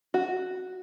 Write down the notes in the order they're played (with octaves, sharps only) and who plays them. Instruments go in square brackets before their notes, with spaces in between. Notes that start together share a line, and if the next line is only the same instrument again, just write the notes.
[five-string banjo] F#4